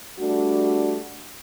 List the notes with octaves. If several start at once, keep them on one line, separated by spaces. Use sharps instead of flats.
G3 A3 D4 F#4